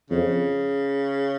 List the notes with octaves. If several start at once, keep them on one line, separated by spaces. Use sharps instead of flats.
F2 C#3